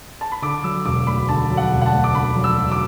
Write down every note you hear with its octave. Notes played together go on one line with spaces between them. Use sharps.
A5
B5
D3 D6
F#3 E6
E1 D6
D2 B5
D3 A5
F#3
F#5
E1
F#5
A5
D2
D6
D3 B5
F#3
E6
E1
D6